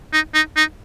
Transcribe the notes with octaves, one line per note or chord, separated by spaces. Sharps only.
D#4
D#4
D#4